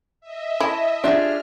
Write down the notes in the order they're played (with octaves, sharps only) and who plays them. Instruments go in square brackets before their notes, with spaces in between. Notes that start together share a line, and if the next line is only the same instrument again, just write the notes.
[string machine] D#5 E5
[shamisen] E4 [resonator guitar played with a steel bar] C#5 A5
[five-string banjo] D4 G#4 [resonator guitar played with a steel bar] F4 G4 E5 [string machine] F6